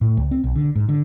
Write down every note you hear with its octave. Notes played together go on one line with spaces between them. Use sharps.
A2
C#2
C4
B1
D3
G#2
D3